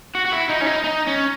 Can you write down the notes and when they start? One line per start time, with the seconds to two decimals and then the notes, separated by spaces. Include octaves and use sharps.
0.15 F#4
0.26 F#4
0.33 E4
0.50 D#4
0.62 C#4
0.67 D#4
0.84 D#4
1.07 C#4